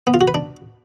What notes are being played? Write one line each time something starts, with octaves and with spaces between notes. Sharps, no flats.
B3
F4
F#4
B4
D4